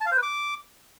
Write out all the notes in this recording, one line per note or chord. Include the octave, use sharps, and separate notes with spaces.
A5
F5
C5
B4
D6